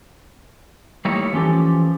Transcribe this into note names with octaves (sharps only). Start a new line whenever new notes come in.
G3 A3 A#3 D#4 E4 C#5
E3 F3 C#4 G4 A4